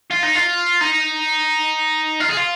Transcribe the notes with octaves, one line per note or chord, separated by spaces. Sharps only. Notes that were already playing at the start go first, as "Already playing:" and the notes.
F4
D#4
F4
D#4
F4
G#4
F4